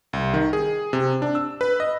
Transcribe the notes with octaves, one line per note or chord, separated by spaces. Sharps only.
C2
D#3
G#4
C3
D4
E6
B4
D#5